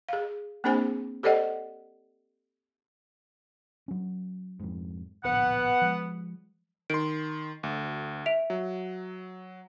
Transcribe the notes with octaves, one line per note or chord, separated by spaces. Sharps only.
G#4 F5
A#3 C4 D4 G#4 C5 G#5
G4 A4 C5 D5 D#5 F#5
F#3 C#4
F2 G#2
D1 A#1 B3 F#5
F3 G#3
D#3 C6 D7
D2
E5 D7 F7
F#3